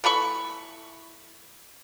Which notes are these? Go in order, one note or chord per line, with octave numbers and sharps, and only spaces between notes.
E3 A3 B5 C#6